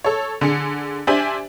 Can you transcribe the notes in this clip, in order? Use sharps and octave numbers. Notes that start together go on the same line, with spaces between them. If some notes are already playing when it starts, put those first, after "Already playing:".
A4 C#5
D3 G#4 C#7
D4 G4 C5 E5 G#5 F#7